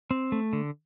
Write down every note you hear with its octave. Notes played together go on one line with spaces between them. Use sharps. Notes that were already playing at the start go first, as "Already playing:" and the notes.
C4
A3
D3